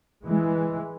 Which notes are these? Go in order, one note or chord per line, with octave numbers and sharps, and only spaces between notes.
E3 G#3